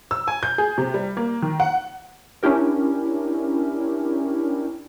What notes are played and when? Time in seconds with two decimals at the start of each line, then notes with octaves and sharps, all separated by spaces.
0.11 E6
0.28 G#5
0.43 G6
0.58 G#4
0.78 C3
0.94 G3
1.17 A#3
1.42 D#3
1.60 F#5
2.43 C#4 D4 E4 G4 A#4